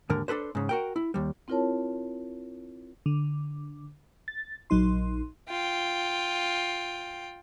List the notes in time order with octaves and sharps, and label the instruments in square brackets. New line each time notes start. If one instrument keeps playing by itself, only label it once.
[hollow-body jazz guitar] D#2 G#2 D3 A#4
D4 A4 B4 C5
G#2 C#3
F#4 A#4 G5
E4
D#2 G3
[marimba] C4 E4 F4 A#4 C#5 A5
[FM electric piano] D3
A6
A#1 F#3 D#4 C6
[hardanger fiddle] F4 G5